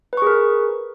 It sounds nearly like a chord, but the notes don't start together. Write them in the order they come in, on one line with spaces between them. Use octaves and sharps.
B4 C#6 G#4 A#4